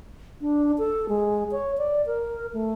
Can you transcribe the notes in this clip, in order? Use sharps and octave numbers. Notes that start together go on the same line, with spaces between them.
D4
A4
G#3
C#5
D5
A#4
A3